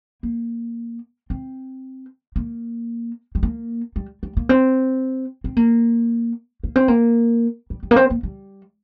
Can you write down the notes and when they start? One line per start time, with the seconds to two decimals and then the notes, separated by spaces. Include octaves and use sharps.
0.23 A#3
1.30 C4
2.36 A#3
3.35 G3
3.43 A#3
3.96 G3
4.23 G3
4.37 A#3
4.49 C4
5.44 C4
5.57 A#3
6.64 A#3
6.76 C4
6.88 A#3
7.70 G3
7.83 G3
7.91 A#3
7.96 C4
8.10 A#3
8.23 G3